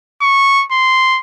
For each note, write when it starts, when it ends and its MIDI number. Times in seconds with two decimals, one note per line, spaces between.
0.21 0.65 85
0.72 1.20 84